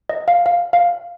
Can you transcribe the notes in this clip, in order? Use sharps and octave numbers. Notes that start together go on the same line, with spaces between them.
D#5
F5
F5
F5